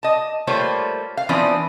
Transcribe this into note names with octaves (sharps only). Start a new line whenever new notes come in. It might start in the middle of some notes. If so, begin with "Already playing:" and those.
D#5 A5
G3 A3 A#3 F4 C5 C#5
F5
E3 F3 B3 C4 D4